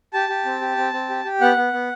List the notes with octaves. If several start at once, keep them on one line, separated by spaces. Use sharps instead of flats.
G4 A5
G4
C4
G4
C4
C4
G4
G4
B3 F#5
B3
B3